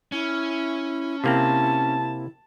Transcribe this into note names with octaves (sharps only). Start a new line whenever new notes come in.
C#4 E4
C3 A#3 C4 E4 A5